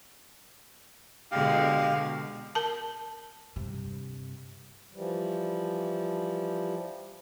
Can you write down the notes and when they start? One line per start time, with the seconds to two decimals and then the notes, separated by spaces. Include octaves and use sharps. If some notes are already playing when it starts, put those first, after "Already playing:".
1.31 B2 D3 G#3 G4 F5
2.55 A#4 A5
3.56 G2 C3
4.94 E3 F3 G3